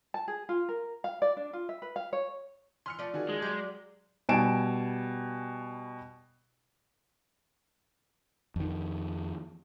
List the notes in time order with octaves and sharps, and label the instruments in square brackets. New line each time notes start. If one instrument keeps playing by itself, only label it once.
[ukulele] A5
G#4
F4
A#4
F5
D5
D4
F4
E5
B4
F5
C#5
[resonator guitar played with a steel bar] E3 [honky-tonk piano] C6 F6 C#7
[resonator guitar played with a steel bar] F3 A3 D5
[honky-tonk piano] D#3 F#4 G#4
[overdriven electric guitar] G#3
[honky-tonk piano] F#3 [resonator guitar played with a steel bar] G4 D5
[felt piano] B2 G3 G#5 A5 D7 E7
[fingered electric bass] F2 D#3